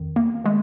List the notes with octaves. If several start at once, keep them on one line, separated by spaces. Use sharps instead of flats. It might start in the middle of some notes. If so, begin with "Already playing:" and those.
Already playing: F2 D#3
A#3
D#3 G#3